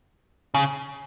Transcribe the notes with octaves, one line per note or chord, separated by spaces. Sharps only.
C#3